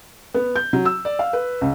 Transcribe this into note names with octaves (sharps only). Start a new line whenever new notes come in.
B3
G6
F#3
E6
D5
F5
B4
C#2